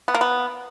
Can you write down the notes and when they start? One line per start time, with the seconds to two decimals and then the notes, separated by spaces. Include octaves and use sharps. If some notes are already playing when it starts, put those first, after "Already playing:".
0.08 B3
0.14 A#3
0.21 B3